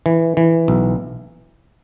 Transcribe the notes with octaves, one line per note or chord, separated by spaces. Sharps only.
E3
E3
B1